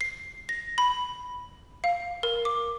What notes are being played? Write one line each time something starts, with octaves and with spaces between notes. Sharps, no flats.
C7
A#6
B5
F5
A#4
D6